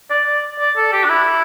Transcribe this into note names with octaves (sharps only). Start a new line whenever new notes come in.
D5
D5
D5
A4
G4
D4
E4